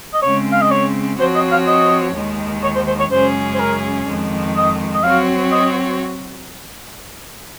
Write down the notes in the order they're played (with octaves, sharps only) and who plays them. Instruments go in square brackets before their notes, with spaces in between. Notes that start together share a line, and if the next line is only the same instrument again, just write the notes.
[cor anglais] D#5
[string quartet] C#3 G#3 C4 [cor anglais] C#5
[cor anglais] F5
D#5
C#5
[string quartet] F3 C4 F#4 C#5 [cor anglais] C5
[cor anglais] D#5
F5
D#5
[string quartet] D#2 D#3 G#3
[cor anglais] C#5
C5
C5
C#5
[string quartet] F#2 C#3 G#3 C#4 G#4 [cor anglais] C5
[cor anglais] C5
A#4
[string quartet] F2 D#3 G#3
[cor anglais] D#5
D#5
[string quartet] F#3 C4 F#4 C#5 [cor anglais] F5
[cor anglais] D#5